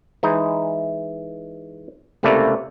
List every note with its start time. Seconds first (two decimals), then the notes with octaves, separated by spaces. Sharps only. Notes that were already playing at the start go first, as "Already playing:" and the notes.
0.23 E3 G#3 D#4
2.23 C#2 C3 A3 A#3 E4 D5